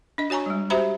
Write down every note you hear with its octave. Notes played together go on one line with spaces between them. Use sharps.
D4 D#5
F#4 C#5 G#5 A#5 C#6
G3 G#3
F#4 G4 C5 E5 A#5 B5